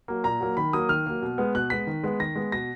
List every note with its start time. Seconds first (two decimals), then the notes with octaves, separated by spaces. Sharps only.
0.08 F#3 A#3
0.24 A#2 A#5
0.41 F#3 A#3
0.57 D#3 B5
0.73 F#3 A#3 D#6
0.89 D#3 F6
1.06 F#3 A#3
1.22 B2
1.38 G#3 B3
1.55 B2 F#6
1.70 G#3 B3 B6
1.87 D#3
2.04 G#3 B3
2.20 D#3 A#6
2.36 G#3 B3
2.52 B2 A#6